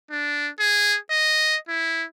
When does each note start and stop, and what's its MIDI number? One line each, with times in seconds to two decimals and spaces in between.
0.10 0.49 62
0.59 0.97 68
1.10 1.56 75
1.68 2.04 64